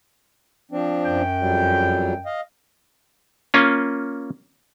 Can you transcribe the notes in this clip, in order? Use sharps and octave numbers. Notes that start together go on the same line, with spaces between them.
F3 C4 D4
F#2 G5
F2 F#3 G3
D#5 F5
A#3 C#4 F4